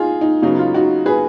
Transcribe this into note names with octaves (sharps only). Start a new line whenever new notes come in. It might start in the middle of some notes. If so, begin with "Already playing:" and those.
Already playing: D#4 F4 G#4
D#4
C#3 F#3 B3 D#4
F4
D#4 F#4
G#4 B4